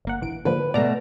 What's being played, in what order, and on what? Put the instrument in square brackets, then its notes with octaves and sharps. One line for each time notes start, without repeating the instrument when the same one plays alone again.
[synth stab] G1 A#3 F#5
A#1 E3 D7
[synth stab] D3 F3 A#3 [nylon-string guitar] B4
[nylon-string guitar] B2 A3 [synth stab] D5 A#5